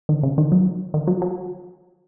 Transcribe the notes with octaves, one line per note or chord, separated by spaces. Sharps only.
D#3
C#3
D#3
F#3
D#3
F#3
F#3